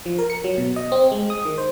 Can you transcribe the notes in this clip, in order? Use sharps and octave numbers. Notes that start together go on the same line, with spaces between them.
F3
A#4
C#7
F#3
B2
D#5
C4
G#3
D#6
D#3
C5